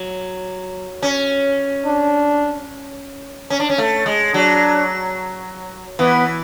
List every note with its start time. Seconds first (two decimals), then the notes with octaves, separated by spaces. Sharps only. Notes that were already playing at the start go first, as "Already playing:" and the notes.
Already playing: F#3
1.03 C#4
1.86 D4
3.50 C#4
3.60 D4
3.70 C#4
3.78 A3
4.06 G#3
4.34 F#3 D4
5.99 E3 B3